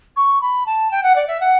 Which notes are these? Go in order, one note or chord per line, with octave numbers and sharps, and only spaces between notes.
C#6
B5
A5
G5
F#5
D5
E5
F#5